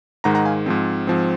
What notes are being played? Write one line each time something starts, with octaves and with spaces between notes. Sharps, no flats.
G#2 D#3 G#3 F#5 A#5
F#5 A#5
F5 G#5
G#2 F3 C4
G#2 F3 C4